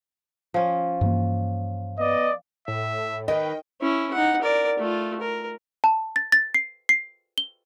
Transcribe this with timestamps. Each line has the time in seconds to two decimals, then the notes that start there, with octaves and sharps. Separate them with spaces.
0.54 F3 C#4
1.01 G2 E3 A#3
1.99 B3 D5 D#5
2.68 A2 E5
3.28 D#3 B4 D#5 G5
3.81 C#4 E4
4.13 D#4 F#5
4.42 A#4 D5
4.79 A3 F4
5.21 A#4
5.84 A5
6.16 A6
6.32 A6
6.54 C7
6.89 C7
7.38 G7